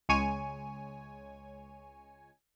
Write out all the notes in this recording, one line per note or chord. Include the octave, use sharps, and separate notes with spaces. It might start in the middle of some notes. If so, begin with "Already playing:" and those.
C#2 G#3 C#5 G#5